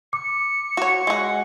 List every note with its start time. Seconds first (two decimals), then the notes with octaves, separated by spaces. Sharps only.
0.13 D6 C#7
0.77 F#4 C#5
1.07 G#3 F#4